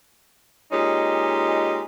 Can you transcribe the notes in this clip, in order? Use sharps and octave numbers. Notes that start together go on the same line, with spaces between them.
A#2 G#3 C#4 D#4 G4